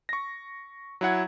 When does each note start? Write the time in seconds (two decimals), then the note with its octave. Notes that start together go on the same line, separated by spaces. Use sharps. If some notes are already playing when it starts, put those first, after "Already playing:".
0.09 C#6 A#6
1.01 F#3 E4 F#5 G#6